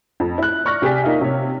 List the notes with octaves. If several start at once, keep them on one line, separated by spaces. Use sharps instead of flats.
F2
E4 F#6
D5 C#6 F6 F#6 A#6
C3 G4 G#4 D5 B6
A#3 D#4 F4 E5
C3 C#5